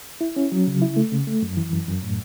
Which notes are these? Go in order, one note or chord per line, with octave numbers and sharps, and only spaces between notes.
E4
C#4
F#3
C#3
E4
A3
C#3
A3
F#2
E3
F#2
F#2
A2